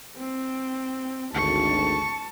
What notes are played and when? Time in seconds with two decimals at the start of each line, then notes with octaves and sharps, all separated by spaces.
0.17 C4
1.35 G#1 D2 A5 C#6